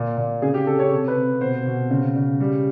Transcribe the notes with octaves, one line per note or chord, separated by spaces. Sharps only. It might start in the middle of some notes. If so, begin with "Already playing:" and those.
Already playing: A#2
A#2
C#3 G#4
G4
C#3 A4
C#5
C3
B4
C3
B2 C5
B2
C#3
C#3
G3